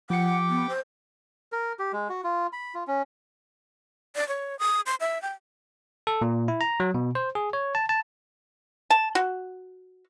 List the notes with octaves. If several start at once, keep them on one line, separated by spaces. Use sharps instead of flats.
F3 G4 F#5 G5 D6 C#7
B3
C5
A#4
G4
G#3
F#4
F4
B5
F4
C#4
D5
C#5
D#6
C6
E5
G5
A4
A#2
E4
A#5
F#3
B2
C5
G#4
C#5
A5
A5
A5
F#4